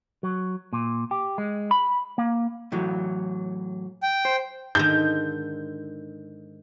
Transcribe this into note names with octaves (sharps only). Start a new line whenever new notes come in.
F#3
A#2
G4
G#3
B5
A#3
A2 E3 F#3
G5
C5
G#2 D3 D#3 G6